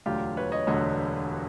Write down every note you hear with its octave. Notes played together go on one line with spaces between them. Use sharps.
E1 D2 D3 F#3 F4 G4
B4 C#5
C#5 D#5
E1 D2 D3 F#3 C#5 D#5